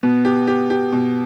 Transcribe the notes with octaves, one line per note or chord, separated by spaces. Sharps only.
B2 B3
G4
G4
G4
B2